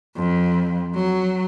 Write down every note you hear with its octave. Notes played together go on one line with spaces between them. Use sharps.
F2
F#3